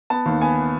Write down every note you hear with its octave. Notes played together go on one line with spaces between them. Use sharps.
B3 A5
D#2
B3 G#5